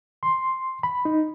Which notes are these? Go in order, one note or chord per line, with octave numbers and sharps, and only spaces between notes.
C6
B5
D#4